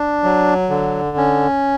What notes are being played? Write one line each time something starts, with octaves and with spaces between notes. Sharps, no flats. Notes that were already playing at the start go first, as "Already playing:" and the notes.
Already playing: D4
F#3
D3
C#4